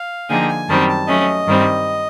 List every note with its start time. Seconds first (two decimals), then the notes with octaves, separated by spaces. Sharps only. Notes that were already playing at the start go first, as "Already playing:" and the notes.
Already playing: F5
0.29 D3 F3 A#3 D#4 G#4 G5
0.49 G#5
0.68 F#2 D#3 G3 C4 A5
0.88 A5
1.07 F#3 A3 C#4 D#5
1.47 G2 D#3 G3 C4